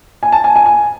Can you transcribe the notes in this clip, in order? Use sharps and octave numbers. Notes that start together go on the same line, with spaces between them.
G#5
A5
G#5
G#5
G#5